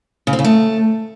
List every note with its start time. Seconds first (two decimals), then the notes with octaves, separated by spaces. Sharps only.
0.27 C#3
0.33 C4
0.39 C#3
0.45 A3